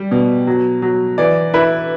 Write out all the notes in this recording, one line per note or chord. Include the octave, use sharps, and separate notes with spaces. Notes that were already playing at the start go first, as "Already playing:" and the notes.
Already playing: G3
B2
F#3
F#3
E3 D5
E4 B4